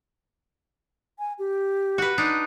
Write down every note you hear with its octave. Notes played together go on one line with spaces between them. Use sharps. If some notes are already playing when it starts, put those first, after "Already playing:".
G#5
G4
F#4 B4
D4 D#4